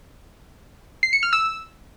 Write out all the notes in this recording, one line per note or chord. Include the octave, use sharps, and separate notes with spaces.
C7
C#7
F6
E6